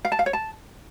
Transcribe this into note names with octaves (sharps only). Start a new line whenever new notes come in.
F5
A5
F5
C#5
A5